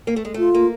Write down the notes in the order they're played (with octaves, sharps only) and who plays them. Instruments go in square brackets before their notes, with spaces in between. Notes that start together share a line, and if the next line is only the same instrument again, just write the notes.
[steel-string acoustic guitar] A#3
A3
G#3
[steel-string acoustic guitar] A3 [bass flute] F4
[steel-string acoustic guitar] A#3